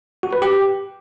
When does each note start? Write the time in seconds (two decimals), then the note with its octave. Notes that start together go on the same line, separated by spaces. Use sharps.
0.23 F#4
0.33 B4
0.42 G4